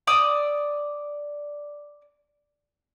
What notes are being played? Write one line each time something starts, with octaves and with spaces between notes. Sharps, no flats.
D5 D#6 E6